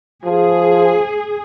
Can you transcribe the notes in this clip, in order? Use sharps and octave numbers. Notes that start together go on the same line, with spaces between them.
F3 G#4